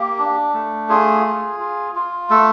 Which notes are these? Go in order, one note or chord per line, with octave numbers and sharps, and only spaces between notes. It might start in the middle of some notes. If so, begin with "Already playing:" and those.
Already playing: A#3 G4
D4
A3
F4 G#4
F4
F4
F4
A3 A4